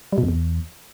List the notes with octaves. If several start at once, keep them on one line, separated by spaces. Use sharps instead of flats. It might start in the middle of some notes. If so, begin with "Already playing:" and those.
G3
B2
F2
E2